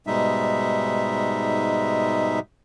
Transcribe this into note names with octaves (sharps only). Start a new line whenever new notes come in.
G#2 B2 G3 G#3 D#4 E5